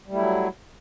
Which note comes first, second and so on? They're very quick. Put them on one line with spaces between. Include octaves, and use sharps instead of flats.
G3 A3 E4 F#3